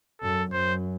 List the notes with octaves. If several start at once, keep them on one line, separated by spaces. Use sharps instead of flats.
F#2 A4
F#2 C5